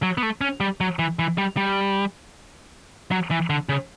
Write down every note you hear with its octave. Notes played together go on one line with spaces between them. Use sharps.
F#3
B3
A3
C#4
G3
F#3
E3
E3
G3
G3
F#3
E3
D3
C#3